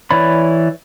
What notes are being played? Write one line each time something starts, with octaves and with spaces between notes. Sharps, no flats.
E3 C#5 D5 B5